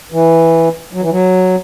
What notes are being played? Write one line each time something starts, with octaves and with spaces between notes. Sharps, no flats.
E3
F#3
E3
F#3